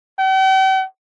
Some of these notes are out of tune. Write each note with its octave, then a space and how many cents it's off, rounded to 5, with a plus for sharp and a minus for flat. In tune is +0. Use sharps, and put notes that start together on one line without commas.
G5 -45